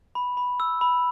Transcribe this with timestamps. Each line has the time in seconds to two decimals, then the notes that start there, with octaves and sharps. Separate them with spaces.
0.15 B5
0.37 B5
0.60 E6
0.81 B5